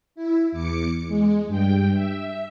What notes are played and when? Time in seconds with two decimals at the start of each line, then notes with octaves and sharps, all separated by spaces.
0.15 E4
0.52 E2 D6 C#7
1.08 G#3
1.47 G2 G5
1.94 E5